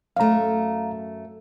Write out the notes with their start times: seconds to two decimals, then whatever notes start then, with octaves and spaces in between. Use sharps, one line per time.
0.16 F#2 A3 F5 A#5